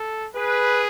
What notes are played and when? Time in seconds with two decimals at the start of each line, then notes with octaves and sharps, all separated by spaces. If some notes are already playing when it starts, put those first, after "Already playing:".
Already playing: A4
0.36 G#4 B4